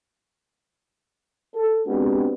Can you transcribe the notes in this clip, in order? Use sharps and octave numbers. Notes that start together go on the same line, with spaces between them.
A4
G#3 B3 C4 D4 F#4 G4